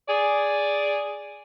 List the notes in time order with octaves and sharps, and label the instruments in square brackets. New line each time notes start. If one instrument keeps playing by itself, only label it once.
[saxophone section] G#4 D5